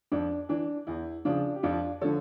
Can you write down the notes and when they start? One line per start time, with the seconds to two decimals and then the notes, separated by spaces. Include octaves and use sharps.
0.12 F2 D4
0.49 E3 D4
0.87 E2 E4
1.25 C#3 F3 D4 F4
1.56 G4
1.63 F2 D4 F4
2.01 D3 F3 A4 C#5